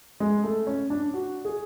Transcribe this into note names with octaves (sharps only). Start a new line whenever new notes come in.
G#3
A3
C#4
D4
F#4
G#4